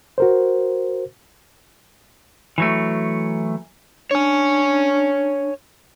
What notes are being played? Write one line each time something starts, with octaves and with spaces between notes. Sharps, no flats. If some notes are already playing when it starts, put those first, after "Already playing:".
F#4 A#4 C5
E3 F#3 A3
D4 C#5 G#5